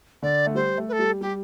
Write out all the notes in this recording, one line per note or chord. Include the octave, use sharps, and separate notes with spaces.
D3 D5
A3
G3 C5
A3
B4
A4
G3
G3 G4